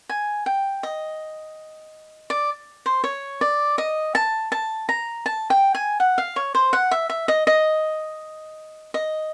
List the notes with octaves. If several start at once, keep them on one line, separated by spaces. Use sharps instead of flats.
G#5
G5
D#5
D5
C5
C#5
D5
D#5
A5
A5
A#5
A5
G5
G#5
F#5
F5
C#5
C5
F#5
E5
E5
D#5
D#5
D#5